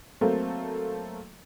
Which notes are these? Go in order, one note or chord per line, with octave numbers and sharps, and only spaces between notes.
F#3 A3 A#3 C4